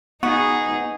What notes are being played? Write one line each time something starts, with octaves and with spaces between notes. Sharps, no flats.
B3 D#4 F#4 G#4